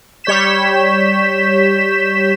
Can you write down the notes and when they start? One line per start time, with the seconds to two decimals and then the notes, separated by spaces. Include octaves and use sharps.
0.24 G3 C#5 G6 B6 E7